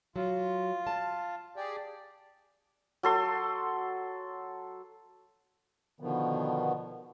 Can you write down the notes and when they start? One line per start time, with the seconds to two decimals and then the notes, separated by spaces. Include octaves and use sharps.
0.16 F#3 F4
0.87 A5
1.56 G4 G#4 D5
3.03 F#3 A4 C6
6.00 B2 D3 D#3 F3 B3